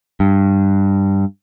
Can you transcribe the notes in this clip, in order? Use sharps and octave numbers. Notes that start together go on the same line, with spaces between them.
G2